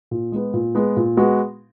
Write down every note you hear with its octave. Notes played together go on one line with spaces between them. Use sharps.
A#2
G#3 B3
A#2
G#3 B3
A#2
G#3 B3 F#4